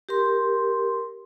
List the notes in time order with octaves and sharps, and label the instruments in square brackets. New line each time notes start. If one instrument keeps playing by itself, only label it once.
[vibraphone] G4 A#4 C6